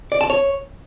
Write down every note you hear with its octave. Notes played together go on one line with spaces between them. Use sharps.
D5
A5
C#5